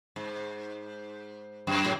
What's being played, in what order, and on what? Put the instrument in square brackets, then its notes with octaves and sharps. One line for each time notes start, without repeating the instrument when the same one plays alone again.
[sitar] G#2
F#2
A2